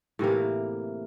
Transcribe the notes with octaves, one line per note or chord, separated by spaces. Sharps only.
A2 C3 E3 A#3